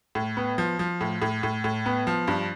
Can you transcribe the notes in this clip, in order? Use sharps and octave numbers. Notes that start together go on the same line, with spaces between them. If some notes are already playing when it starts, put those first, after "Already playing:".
A2
B3
F3
F3
A2
A2
A2
A2
B3
F3
G2